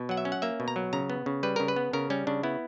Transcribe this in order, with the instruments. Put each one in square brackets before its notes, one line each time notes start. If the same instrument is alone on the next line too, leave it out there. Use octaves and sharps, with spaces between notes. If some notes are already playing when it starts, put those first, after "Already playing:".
Already playing: [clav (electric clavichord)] B2
F#3 F#5
E5
C#4
F#5
A#3 E5
B2
A#5
F#3
C#3 A#5
B3
C#3
G3 B4
C#3 A#4
B4
B3
C#3 A#4
G3 C#4
C#3 D4
B3 E4